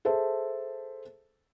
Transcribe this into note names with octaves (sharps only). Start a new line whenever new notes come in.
G#4 A4 C5 E5 A5